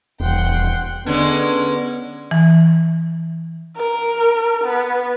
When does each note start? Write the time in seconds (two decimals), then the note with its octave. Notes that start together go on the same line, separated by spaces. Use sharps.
0.20 D#1 E2 F#5 G5 C6
1.06 D3 G#3 B3 C#4
2.31 E3
3.77 A#4
4.64 B3